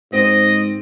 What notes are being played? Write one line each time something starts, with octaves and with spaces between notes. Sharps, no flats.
G#2 C4 D#5